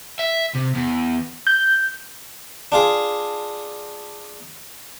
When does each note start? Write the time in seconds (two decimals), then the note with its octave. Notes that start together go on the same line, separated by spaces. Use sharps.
0.19 E5
0.55 C3
0.75 E2
1.47 G6
2.72 D4 F4 G#4